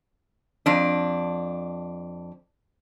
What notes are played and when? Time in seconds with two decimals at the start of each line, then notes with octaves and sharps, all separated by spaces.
0.66 F2 D4